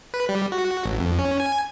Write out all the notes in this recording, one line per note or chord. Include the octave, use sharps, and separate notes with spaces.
B4
G3
F#4
A1
F2
C#4
G#5